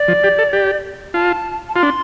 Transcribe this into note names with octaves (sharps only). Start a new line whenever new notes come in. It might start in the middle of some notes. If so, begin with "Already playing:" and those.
Already playing: D5
F3
G4
A4
G4
F4 A5
A5
F4 C6
D4